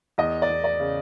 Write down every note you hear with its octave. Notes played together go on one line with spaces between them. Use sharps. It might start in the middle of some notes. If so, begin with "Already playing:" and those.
E2 D#5
D5
E2
D5
C#3